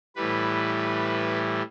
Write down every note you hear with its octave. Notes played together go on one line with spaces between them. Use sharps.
A2 E3 G3 B4